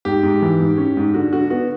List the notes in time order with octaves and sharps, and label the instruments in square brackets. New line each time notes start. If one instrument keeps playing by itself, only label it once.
[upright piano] G#2 [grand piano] G4
[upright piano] G#2
E3
G#2
C#4
G#2
[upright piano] D3 [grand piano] F#4
[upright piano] D3 [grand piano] F#4
[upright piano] B3 [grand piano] F#4